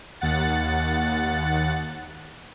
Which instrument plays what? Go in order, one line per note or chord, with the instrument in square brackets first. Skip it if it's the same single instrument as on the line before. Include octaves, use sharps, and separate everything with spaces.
[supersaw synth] D#2 F#5 A6